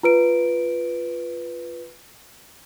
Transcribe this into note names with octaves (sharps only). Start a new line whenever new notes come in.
F4 B4 D7